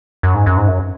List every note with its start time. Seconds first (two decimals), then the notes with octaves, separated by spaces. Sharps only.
0.23 F#2
0.34 G#2
0.46 F#2
0.57 G#2
0.68 F#2